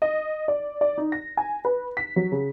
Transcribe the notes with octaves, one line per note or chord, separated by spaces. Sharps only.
D#5
D5
D5
D#4
A#6
G#5
B4
B6
F#3
C#3